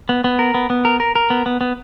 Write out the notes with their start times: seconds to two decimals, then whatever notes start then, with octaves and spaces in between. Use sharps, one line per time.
0.09 B3
0.24 B3
0.39 A#4
0.54 B3
0.70 B3
0.85 A#4
1.00 A#4
1.15 A#4
1.30 B3
1.46 B3
1.61 B3